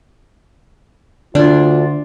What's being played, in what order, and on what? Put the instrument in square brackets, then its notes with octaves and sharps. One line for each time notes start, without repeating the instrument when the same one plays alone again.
[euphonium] D2 [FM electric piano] D3 [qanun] D4 [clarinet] F4